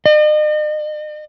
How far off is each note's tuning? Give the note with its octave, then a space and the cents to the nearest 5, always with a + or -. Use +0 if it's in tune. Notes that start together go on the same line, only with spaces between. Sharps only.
D#5 -45